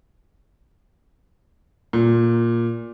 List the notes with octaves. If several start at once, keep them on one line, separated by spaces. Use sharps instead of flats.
A#2